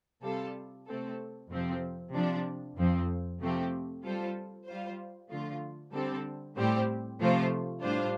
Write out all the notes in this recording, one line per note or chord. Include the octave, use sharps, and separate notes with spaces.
C3 G3 F4 A4
C3 A3 C4 A4
F2 C3 F3 C4
C3 F3 D4
F2 F3 C4
C3 F3 A3 C4 G4
G3 F4 A4 C5
G3 F4 C5
D3 F3 A3 F4
D3 G3 C4 A4
A2 G3 C4 G4 C5
C3 F3 A3 F4 C5
A2 G3 D4 F4 C5